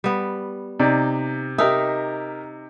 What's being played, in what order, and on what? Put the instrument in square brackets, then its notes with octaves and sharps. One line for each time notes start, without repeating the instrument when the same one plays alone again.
[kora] G3 B3
[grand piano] C3 [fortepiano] D#4 D5
[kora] D#4 [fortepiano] G4 A#4 E5